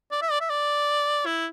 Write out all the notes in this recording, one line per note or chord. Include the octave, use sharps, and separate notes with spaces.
D5
E5
D5
E5
D5
E4